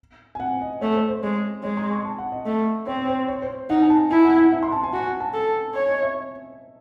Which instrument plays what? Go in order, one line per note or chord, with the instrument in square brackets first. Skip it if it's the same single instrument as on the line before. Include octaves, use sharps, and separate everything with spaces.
[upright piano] G#5
F#5
D#5
[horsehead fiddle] A3 [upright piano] C#5
[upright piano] C5
C5
[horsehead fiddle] G#3 [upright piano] C#5
[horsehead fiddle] G#3 [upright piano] C#5
[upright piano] C6
C#6
A5
F#5
D#5
[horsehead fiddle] A3
[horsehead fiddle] C4 [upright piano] C#5
[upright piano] C#5
C5
C#5
C5
[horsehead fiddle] D#4 [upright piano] F#5
[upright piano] G#5
A5
[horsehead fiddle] E4 [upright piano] G#5
[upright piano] F#5
F#5
E5
C6
A5
G#5
[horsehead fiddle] F#4 [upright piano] F#5
[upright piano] G#5
A5
[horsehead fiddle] A4
[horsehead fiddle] C#5 [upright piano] G#5
[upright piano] D#5
E5